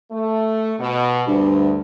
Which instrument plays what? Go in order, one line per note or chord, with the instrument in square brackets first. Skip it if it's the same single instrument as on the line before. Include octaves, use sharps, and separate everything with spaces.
[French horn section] A3
B2
[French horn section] D2 [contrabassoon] G2